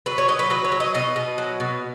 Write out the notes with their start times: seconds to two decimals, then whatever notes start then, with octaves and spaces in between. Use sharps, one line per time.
0.06 F#3 B4
0.18 C#5
0.28 F#3 D#5
0.39 B4
0.50 F#3 B4
0.65 C#5
0.72 F#3
0.80 D#5
0.94 B2 D#5
1.16 B2
1.38 F#3
1.60 B2